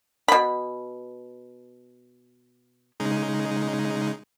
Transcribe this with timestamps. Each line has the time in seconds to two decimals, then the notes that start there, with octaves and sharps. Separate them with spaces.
0.28 B2 B5
3.00 C#3 G#3 D#4